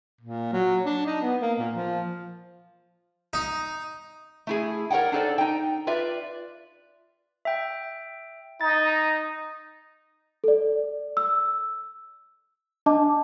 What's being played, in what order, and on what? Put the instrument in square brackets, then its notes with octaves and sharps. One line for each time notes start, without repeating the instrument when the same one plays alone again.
[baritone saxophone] A#2
F#3
D4
D#4
B3
A#3
A#2
F3
[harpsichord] D#4
[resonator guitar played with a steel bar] A3 E4 G#4
A#4 C#5 D5 F#5 G5
D4 D#4 A4 C5 D5
D#4 G5
F4 B4 D5 E5
[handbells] E5 G5
[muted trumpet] D#4 [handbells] A6
[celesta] A4 D5
E6
D4 D#5 A5 D6